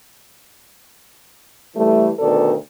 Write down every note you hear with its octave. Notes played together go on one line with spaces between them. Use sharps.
E3 G3 A3
D2 B2 D#3 A4 D5